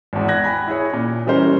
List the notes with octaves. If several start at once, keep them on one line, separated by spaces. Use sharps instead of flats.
G#1 E2
F#6 G#6 A#6
G5 G#5 B5
E4 G#4 C#5
A#2
E3 G3 C#4 A#4 C5